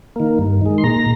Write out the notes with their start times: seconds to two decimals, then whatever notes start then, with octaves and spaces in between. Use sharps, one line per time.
0.16 D#3 A#3
0.39 G2
0.61 D#3 G#3
0.78 C6
0.83 A#2 A#5